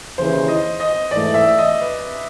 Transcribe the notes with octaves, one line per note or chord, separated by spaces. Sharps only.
D#2 C#3 E3 C5
D#5
D#5
G#2 E3 A3 D5
E5
D#5
B4